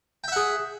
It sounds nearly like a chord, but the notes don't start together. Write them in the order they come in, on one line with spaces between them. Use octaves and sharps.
G5 E5 F#5 G#4